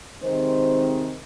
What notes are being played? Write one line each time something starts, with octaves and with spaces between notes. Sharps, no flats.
C3 D#3 G#3 C4 C5